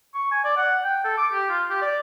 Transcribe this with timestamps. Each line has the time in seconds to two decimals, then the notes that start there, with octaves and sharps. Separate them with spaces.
0.14 C#6
0.32 G#5
0.45 D5
0.57 F#5
0.84 G5
1.04 A4
1.17 D6
1.32 G4
1.49 F4
1.70 G4
1.82 D5